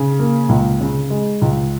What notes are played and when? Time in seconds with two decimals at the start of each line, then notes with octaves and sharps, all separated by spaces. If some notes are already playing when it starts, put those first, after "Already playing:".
Already playing: C#3
0.19 A#3
0.49 C#2
0.81 C#3
1.10 G#3
1.42 C#2